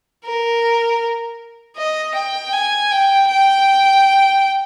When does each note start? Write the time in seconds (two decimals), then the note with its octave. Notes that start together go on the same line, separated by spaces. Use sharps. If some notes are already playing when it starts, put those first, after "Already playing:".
0.25 A#4
1.77 D#5
2.15 G5
2.53 G#5
2.91 G5
3.28 G5